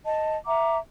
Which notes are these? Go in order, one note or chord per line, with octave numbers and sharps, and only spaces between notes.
D#5 A5
E5 F#5 A#5 D6